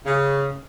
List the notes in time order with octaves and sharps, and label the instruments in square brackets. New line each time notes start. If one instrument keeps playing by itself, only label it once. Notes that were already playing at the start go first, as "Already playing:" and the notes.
[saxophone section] C#3